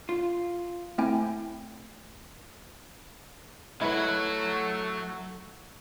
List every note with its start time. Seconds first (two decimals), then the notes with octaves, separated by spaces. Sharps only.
0.09 F4
0.98 A3 C4 E4 G5 G#5
3.81 F#3 A3 E4 F#4 B4